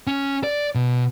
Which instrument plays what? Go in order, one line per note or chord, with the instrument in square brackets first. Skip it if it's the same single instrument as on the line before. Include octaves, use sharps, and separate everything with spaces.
[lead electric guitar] C#4
D5
B2